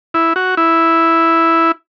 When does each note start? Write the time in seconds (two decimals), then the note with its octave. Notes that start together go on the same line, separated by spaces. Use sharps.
0.14 E4
0.36 F#4
0.57 E4